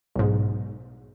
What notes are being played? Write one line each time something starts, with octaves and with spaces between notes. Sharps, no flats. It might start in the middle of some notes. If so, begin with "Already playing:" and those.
B1 G#2